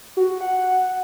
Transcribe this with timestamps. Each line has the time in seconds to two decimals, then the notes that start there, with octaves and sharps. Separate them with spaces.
0.17 F#4
0.41 F#5